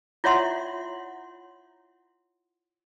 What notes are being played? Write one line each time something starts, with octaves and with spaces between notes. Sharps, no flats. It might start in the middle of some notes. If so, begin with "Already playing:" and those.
E4 F4 C#5 E5 F#5 C6